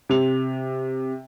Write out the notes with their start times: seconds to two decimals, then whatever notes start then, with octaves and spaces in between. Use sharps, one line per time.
0.09 C3 F7